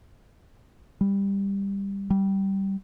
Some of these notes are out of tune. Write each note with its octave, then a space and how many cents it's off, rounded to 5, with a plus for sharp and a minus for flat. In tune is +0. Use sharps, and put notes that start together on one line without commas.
G3 +15
G3 -15